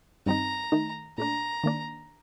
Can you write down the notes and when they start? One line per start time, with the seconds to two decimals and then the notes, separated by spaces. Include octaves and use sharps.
0.26 G2 D#3 G3 C4 D#4 A#5
0.72 D#3 A3 D#4
1.18 A#2 A3 D4 A#5
1.64 D#3 A#3 D4